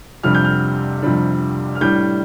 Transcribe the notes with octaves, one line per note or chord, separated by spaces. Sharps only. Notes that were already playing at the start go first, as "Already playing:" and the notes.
F2 C3 G3 D4 F6
G6
F6
F2 C3 G3 D4
F6
A2 G3 D4 G6